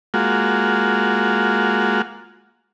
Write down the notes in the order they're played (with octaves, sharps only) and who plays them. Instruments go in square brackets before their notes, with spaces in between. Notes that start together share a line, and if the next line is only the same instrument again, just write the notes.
[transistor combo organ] G#3 A#3 F4 F#4